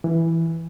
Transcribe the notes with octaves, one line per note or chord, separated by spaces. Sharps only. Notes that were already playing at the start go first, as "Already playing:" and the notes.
E3